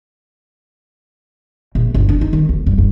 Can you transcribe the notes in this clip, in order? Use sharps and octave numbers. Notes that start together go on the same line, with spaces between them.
A#1
G1
D4
D#4
D#3
D2
G2
G2